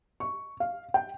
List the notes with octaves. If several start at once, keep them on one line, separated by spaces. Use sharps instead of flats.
C#6
F5
G5